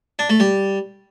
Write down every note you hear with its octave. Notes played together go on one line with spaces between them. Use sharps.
D4
A3
G3